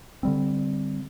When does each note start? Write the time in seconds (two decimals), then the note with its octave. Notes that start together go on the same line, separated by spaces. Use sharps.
0.23 D3 G3 C4